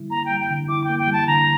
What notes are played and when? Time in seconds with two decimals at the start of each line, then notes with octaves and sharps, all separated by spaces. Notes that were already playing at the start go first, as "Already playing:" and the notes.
Already playing: D3 G3 E4
0.10 A#3 A#5
0.26 G5
0.31 G3
0.40 G5
0.50 D3
0.69 E4 D6
0.84 G5
0.89 A#3
0.99 G5
1.08 G3
1.13 A5
1.27 D3 A#5